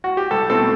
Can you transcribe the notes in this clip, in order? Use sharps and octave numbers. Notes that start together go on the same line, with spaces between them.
F#4
G4
C2 A4
B2 A3 C4 A4